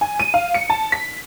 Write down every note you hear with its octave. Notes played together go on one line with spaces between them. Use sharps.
G#5
D#7
F5
C#7
A5
B6